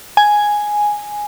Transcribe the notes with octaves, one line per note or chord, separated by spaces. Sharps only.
G#5